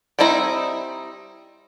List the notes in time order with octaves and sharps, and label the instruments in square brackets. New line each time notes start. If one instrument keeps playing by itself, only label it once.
[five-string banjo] G3 C4 D#4 E4 A#5